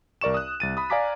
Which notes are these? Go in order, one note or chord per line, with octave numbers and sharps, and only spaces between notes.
C2 A#4 D5 C#6 E7
D#6 F#6
C2 A6 D#7
B5 D#6
D5 F5 G#5 A#5 D6 B6